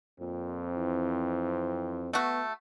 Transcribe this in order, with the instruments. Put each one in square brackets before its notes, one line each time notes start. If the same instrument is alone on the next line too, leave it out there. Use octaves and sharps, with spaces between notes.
[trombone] F2 [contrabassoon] A#2 [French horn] C4
[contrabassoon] E3
[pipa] A3 F#4 [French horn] B3